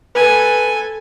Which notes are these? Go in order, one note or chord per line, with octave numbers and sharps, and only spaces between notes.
A4 B4 G#5